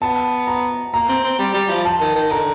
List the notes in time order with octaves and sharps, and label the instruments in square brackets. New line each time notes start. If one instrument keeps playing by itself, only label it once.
[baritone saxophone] B3 [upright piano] A5
[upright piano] A#5
[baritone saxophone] A#3 [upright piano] A#5
[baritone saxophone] C4
C4
G3
G3
F3
[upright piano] A5
[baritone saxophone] D#3
D#3
[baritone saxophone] D3 [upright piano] A#5